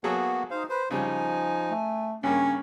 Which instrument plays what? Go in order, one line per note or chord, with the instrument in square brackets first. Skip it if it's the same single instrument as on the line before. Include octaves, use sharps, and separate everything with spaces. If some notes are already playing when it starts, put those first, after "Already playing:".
[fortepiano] F#3 G#4 A4 [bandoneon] A#3 B3 F#4
[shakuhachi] D#4 [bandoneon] C5 F5
[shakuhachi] B4 [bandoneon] C5
[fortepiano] C#3 G3 [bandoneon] F3 D#4 [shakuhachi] G#5
[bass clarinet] A3
[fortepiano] G2 A#3 [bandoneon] C#3 [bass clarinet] C#4 [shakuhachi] C#5